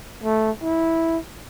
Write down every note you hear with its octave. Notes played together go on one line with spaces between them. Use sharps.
A3
E4